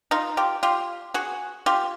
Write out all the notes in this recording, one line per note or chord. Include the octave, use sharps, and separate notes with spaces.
D#4 F4
F4 G4
F4 G4
F#4 G#4
F4 G4